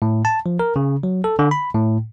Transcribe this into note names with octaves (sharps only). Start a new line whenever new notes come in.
A2
A5
F3
A#4
C#3
F#3
A4
D3
B5
A2